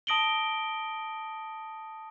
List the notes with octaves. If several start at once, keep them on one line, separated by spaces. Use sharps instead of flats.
A5 D#6 A#6 D7 F#7 G7